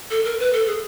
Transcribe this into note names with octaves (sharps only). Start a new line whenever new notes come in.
A4
A#4
B4
A4
G#4